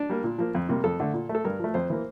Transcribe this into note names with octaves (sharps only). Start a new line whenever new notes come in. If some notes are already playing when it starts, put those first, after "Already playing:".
Already playing: D4
G3 A#3
A#2
F3 A#3
F2
C3 G3 A#3
F2 A4
D3 A3
A#2
A3
A4
G2 A#4
F3 A3
F2 C5
E3 A#3